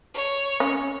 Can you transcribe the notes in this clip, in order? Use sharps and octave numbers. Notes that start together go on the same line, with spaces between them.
C#5
C#4